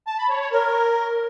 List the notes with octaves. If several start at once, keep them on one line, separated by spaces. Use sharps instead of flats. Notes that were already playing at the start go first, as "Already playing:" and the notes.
A5
B5
C#5
C#5
A#4